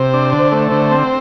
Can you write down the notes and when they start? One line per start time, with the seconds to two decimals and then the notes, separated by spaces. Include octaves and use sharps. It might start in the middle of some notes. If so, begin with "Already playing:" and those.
Already playing: C3 C5
0.14 D4
0.32 D3
0.52 A3
0.71 D3 C5
0.91 C4